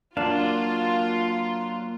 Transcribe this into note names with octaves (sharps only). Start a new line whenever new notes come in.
F#3 A#3 D4 F4 A#4 F5 A5 C7